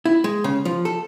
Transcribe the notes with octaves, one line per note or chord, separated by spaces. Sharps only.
E4
G#3
C#3
F3
A4